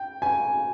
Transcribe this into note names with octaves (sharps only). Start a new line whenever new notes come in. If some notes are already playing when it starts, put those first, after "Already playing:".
Already playing: G5
G#5